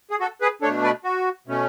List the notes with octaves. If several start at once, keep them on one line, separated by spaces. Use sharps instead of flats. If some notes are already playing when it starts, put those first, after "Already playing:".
G#4
F#4 A4
G#4 B4
B2 A3 D4 A4 C#5
B4 D5
F#4
B2 A3 C#4